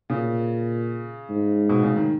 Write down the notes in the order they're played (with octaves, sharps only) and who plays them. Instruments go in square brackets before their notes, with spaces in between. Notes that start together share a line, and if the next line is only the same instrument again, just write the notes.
[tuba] A#2 [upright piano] C#3
[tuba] G#2
[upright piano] B2
C#3
D#3